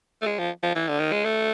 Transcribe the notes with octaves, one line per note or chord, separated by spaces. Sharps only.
A3
G#3
F3
F3
E3
D3
D#3
G#3
A3